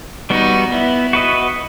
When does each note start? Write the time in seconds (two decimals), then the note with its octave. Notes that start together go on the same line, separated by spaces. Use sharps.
0.30 G3 B3 D#4 F#4
0.72 B3 E4
1.13 F#4 B4 D#5